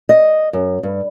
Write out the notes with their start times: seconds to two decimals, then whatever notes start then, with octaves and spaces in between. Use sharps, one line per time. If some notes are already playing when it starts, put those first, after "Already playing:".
0.09 D#5
0.53 F#2
0.83 G2